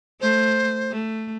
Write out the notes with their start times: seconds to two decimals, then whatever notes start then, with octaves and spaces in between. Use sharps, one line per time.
0.21 A3 C5
0.91 A3